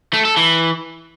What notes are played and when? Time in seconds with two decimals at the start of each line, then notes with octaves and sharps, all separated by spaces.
0.13 A3
0.25 A4
0.37 E3